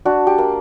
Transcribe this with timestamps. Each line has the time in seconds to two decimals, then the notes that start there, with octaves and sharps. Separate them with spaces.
0.05 D4 F#4
0.27 G4
0.38 A#3